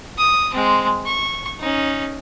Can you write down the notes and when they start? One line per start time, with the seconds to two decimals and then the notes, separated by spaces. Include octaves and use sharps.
0.18 D#6
0.54 G#3 C4
1.06 C#6
1.60 C#4 D#4